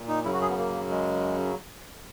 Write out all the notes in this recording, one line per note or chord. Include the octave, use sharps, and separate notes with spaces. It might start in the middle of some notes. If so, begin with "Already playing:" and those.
Already playing: A#2
D#4
F#2 C#3 F#3 E4
F#4
G#4
B3
A#3
G#3